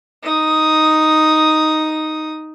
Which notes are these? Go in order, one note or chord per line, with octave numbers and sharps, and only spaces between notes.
D#4 D#6